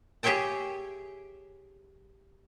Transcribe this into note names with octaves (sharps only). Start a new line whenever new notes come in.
G4 G#4 C#5 E5 G5 A5